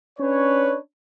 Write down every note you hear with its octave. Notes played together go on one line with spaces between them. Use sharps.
C#4 D4 B4 C#5